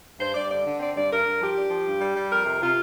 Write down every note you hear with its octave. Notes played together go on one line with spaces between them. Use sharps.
G2 C5
G2 D5
D3 D5
D3
C4 D5
G2 D5
G2 A#4
G2
F3 G4
D4
F3
G2
G3
G3
F2 A#4
C3
C3 F4